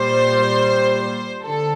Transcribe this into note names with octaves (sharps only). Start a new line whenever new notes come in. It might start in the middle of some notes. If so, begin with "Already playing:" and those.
Already playing: A#2 G3 C5
D3 A4